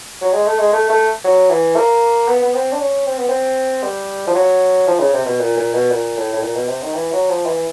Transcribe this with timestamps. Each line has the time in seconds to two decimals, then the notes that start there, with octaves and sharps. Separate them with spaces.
0.21 F#3
0.33 G#3
0.46 A3
0.59 G#3
0.73 A3
0.90 A3
1.24 F#3
1.50 E3
1.76 A#3
2.28 B3
2.42 B3
2.54 C4
2.72 D4
2.80 C#4
3.06 C4
3.18 B3
3.28 C4
3.83 G3
4.27 F3
4.35 F#3
4.87 F3
5.00 C#3
5.13 C3
5.26 B2
5.40 A#2
5.57 A#2
5.74 B2
5.91 A#2
6.17 A2
6.33 A2
6.42 A#2
6.56 B2
6.68 C3
6.82 D#3
6.95 E3
7.12 F#3
7.29 F3
7.46 E3